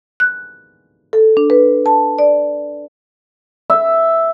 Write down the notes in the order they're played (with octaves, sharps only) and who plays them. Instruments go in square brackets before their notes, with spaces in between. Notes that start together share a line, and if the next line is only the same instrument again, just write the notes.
[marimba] F#6
A4
D4
B4
A5
D5
[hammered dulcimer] E5